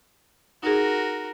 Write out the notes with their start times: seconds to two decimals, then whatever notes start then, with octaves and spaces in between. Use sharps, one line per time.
0.63 D#4 F#4 G#4 A#4